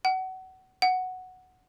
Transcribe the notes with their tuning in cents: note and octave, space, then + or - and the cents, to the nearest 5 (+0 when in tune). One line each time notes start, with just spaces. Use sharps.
F#5 +25
F#5 +0